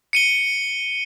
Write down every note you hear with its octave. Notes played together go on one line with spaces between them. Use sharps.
C#7 D#7 G7